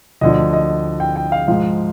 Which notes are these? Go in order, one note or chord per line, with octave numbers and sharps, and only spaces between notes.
D2 D3 F3 D#5
D#5
G5
G5
F5
G#2 F3 F5